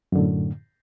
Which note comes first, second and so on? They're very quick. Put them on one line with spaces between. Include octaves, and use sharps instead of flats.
F#2 D3 A2